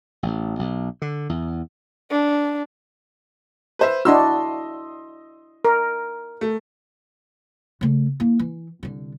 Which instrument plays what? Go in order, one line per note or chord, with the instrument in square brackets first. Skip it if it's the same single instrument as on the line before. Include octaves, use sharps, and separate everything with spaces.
[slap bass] A1
B1
D3
E2
[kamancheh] D4
[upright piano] B4 C5 E5
[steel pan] D4 E4 F#4 [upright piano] D#5 C6 E6
[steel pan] A#4
[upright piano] A3
[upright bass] C#3 A3
A#3 E4
E3
C2 D3